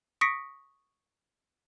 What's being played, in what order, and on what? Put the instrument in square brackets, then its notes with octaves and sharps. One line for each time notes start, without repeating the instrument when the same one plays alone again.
[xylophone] C#6 D#6 A#6 B6 C#7 D7